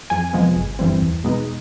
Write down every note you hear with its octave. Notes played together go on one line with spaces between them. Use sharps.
F2 G#5
C3 F3 G#3 B3
G1
G2 E3 G3 C4
E2
B2 G#3 B3 D#4